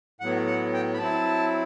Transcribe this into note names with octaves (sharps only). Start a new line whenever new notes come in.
A2 F#3 B3 F#5
F#5
G5
B5
F#3 C4 E4 A5